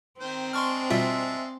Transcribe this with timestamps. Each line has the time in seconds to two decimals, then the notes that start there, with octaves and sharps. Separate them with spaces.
0.20 D#3 C4 C5
0.53 G#3 D4 C6 C#6 F6
0.90 B2 G3 F4 E5